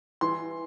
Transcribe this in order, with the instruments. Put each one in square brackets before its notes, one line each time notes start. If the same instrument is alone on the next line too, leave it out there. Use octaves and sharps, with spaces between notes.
[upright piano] E3 C6